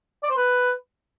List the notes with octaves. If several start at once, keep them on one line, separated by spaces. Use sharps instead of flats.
D5
C5
B4